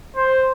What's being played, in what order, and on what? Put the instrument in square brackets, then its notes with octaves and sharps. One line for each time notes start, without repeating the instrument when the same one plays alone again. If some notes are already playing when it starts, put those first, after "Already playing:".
[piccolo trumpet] C5